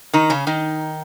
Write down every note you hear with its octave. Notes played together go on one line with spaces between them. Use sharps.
D#3 D#4
C#3 C#4
D#3 D#4